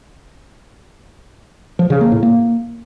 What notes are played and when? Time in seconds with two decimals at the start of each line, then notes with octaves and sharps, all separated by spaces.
1.79 F3
1.90 C#3
2.01 A#3
2.12 A2
2.23 A#3